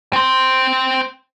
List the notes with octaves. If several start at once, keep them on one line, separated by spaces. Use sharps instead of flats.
C4 C5